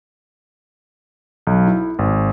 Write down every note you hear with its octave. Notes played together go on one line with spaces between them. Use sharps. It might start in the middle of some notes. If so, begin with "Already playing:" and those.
B1
E4
G#1